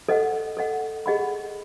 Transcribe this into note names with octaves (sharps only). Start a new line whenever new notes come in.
A4 D#5 F#5
A4 D#5 F#5
G#4 D#5 F#5 B5